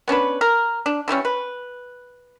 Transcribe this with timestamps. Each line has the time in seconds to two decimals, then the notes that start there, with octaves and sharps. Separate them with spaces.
0.08 B3 C#4 D4 B4
0.41 A#4
0.86 D4
1.08 D3 E3 G3 C#4
1.25 B4